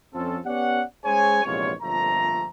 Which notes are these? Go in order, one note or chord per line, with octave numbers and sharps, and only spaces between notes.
F2 F3 C4 C#4 F4 A4
B3 C#4 G4 D5 F#5
G#3 C#4 G#4 C5 C#5 G#5
A#1 E2 C3 G#3 F4 C#5
G1 F2 A#2 F3 A3 A#5